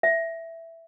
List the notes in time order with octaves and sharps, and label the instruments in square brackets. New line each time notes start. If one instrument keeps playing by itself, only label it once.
[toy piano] E5